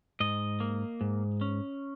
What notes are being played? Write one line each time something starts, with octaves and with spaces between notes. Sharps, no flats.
G#2 D#5
A#3
G#2
C#4